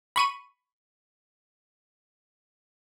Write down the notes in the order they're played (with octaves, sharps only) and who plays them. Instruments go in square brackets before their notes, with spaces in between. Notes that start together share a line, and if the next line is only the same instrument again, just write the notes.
[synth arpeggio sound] B5 C#6 D#7